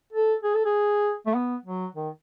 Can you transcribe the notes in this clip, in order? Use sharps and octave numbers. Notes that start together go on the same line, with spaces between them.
A4
G#4
A4
G#4
A3
B3
F#3
D#3